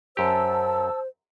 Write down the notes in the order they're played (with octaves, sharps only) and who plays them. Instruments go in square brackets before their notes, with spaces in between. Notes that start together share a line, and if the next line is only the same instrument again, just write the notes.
[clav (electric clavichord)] F#2 G4 [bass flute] C5 [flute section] A5 E6